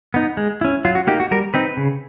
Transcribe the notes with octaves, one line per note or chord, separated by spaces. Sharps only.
B3 D#4
G#3
C#4 E4
F#3 F4
F#4
A#3 D#4 G4
F#4
G3 A#4
C4 D#4 B4
C#3